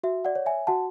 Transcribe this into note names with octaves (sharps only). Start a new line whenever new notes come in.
F#4 E5
D5 F#5
C#5
E5 G#5
F#4 F#5 A5